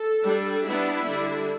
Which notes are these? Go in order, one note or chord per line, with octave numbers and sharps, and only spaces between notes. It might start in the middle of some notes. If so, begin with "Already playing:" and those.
Already playing: A4
G3 D4
G3 B3 D4 E4
D3 G3 D4